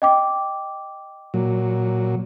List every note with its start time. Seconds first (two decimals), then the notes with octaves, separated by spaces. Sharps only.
0.02 D#5 G5 D6
1.34 A#2 F#3